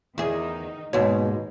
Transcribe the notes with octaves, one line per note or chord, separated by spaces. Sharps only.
E2 D#3 D#4 G#4
D#2 G#2 B2 G#3 C#5